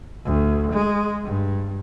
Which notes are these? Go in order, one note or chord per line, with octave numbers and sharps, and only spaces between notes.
D2
G#3
G2